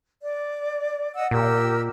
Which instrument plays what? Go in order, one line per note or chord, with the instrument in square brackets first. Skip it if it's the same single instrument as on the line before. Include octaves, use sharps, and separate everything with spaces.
[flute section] D5
D#5 F#5 E6
[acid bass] A#2 [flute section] G4 A#4 E6